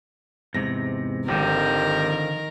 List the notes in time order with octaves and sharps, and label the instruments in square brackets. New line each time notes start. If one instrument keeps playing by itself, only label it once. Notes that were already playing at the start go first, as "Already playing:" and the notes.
[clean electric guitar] E2 G#2 C3 [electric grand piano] A#6
[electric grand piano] G#1 [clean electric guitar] D3 F3 [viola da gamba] D#3 A#4 [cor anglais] G4